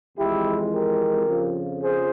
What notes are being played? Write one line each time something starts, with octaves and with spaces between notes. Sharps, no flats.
F2 E3 G#3 E4 G4
G4 A#4
F2 C#3 F3
G#4 C5